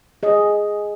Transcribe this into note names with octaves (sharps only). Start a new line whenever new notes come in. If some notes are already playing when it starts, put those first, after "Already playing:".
G#4 D#5